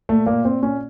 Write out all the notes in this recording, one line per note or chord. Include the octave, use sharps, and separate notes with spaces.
A#2 A3
A#2 A#3
A#2 C4
A#2 C#4